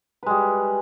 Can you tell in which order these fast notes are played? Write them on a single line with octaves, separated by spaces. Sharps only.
B4 G#3 G3